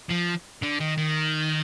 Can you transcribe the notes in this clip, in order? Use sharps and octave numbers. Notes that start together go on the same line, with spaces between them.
F3
D3
D#3
D#3